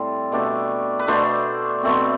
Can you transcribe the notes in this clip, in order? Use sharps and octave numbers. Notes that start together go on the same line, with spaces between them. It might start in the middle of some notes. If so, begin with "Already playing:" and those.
Already playing: A2 G3 C4 A4
B2 A3 D4 G4
B4
B2 A3 D4 C5
B2 A3 C4